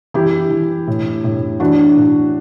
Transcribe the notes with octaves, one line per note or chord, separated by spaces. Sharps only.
E3 E4 G4
E3
A2
A2
E3 D4 F#4
A2